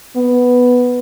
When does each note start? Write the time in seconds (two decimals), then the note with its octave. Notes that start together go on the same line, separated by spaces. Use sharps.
0.16 B3